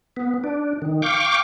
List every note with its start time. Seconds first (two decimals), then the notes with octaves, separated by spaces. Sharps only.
0.17 B3
0.44 D4
0.82 D#3
1.02 F5 G5 C#6 D6